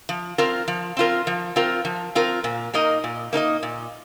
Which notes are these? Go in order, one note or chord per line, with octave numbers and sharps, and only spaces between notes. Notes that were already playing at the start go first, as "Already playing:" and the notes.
F3
C4 F4 A#4
F3
C4 F4 A#4
F3
C4 F4 A#4
F3
C4 F4 A#4
A#2
A#3 D#4 A#4 D#5
A#2
A#3 D#4 A#4 D#5
A#2